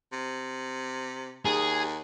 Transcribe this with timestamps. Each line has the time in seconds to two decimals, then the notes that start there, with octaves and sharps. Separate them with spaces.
0.13 C3
1.45 D#2 G#4